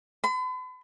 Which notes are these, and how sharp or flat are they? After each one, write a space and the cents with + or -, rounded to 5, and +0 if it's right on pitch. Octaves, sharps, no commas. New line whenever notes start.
B5 +45